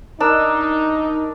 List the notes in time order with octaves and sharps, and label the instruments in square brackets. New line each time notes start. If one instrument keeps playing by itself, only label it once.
[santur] D4 A#4 E6 [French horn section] D#4